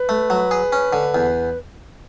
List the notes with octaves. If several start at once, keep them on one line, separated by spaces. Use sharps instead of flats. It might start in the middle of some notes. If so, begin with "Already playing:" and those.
Already playing: B4
A3
F#3
G#4
C#4
D3
E2